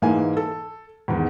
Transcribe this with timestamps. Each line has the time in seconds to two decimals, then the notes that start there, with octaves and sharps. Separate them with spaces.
0.02 G#2 E3 A#3 F5 G#5
0.37 A4
1.08 E2 G#2 D#3